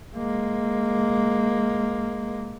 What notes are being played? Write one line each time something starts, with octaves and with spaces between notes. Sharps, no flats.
G#3 A#3